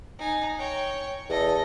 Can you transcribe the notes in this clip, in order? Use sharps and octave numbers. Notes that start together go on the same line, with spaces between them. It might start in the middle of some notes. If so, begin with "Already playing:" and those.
D#4 G#5
C#5 G5
E2 A4 D#5